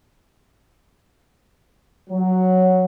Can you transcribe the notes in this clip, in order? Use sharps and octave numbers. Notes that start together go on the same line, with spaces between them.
F#3